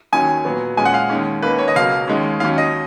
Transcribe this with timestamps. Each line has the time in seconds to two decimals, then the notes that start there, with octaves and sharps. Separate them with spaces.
0.12 D#2 D#3 F#3 C#4 G#5
0.45 A#2 F#3 B3
0.77 A#2 G#3 C#4 G#5
0.85 F#5
0.94 F5
1.10 D#2 D#3 G#3 C#4
1.42 D#2 D#3 A#3 C#4 B4
1.59 C#5
1.68 D#5
1.76 C#2 B2 F#3 A#3 F5
2.08 D#2 D#3 G#3 C#4
2.40 D#2 D#3 F#3 C#4 F5
2.58 D#5